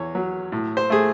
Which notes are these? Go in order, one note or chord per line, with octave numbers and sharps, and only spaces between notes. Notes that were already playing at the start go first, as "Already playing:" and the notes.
Already playing: E2 C#5
F#3
A2
C5
A3 G#4